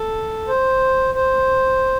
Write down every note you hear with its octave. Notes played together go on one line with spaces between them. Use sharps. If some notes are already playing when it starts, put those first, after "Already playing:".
Already playing: A4
C5
C5